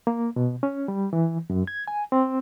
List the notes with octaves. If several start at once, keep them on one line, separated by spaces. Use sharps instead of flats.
A#3
B2
C#4
G3
E3
F#2
G#6
G#5
C4